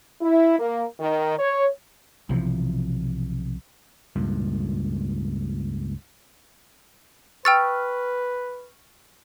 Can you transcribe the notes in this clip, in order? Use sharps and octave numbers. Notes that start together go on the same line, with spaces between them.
E4
A#3
D#3
C#5
B1 C3 E3 F3
C#2 G2 A#2
B4 G5 C#6 E6 F6 A6